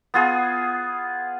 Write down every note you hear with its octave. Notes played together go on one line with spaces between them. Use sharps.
B3 F4 G#4